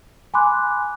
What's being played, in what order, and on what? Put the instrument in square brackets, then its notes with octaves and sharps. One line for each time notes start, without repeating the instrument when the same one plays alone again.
[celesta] G#5 B5 C6 D6 F#6